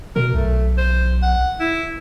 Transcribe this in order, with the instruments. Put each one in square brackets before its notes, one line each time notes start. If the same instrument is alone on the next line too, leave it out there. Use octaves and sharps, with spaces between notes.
[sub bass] B2 [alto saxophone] A#4
[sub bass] B1 [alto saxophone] A3
[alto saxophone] C5
F#5
E4